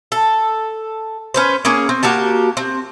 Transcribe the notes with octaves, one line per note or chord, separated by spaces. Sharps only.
A4
C#4 B4 C5
A#3 C#4 G#4
C4
A#3 F#4 G4 A5
C4